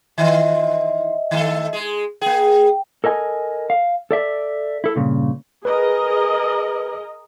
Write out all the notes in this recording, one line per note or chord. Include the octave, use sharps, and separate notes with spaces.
D#3 E3 F4 D#5 E5
D#3 A3 A4
G#3 G#4
A#3 G#4 G5
A4 A#4 D#5 G#5
F5
A4 D5 E5
E4 A4
G2 A#2 C#3
G#4 A#4 B4 D#5